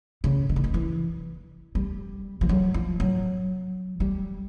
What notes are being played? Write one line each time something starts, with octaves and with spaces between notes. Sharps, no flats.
C#3
D#3
D3
D#3
E3
G3
F3
F#3
F3
F#3
G3